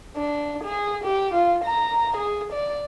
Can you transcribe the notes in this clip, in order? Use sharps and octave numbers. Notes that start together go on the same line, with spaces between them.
D4
G#4
G4
F4
A#5
G#4
D5